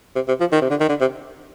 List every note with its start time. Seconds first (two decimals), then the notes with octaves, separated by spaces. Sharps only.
0.16 C3
0.28 C3
0.40 F3
0.52 D#3
0.61 C3
0.70 D3
0.80 D#3
0.89 D3
1.01 C3